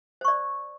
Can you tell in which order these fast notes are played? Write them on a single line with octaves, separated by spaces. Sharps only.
C5 C#6 D5